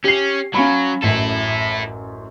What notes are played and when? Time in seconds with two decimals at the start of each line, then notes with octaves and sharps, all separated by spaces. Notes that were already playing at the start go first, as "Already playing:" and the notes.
0.04 C#4 G4 C7
0.54 F#3 C#4 F5 B5
1.03 A1 F#2 E4 A4